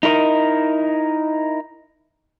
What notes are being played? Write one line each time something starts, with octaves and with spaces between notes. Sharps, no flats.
D#4 E4 A#4 B4 D#5